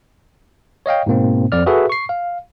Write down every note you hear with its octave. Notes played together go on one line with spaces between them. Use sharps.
C#5 D#5 F5 G5
G#2 B2 A#3 C4
F2 D5 F6
F#4 G#4 A4 B4 E5
C#6 C7
F5